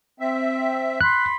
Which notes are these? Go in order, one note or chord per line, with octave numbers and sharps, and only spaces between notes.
C4 E5
B5 C6 F#6